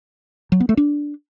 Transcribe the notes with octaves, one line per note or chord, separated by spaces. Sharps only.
F#3
B3
A3
D4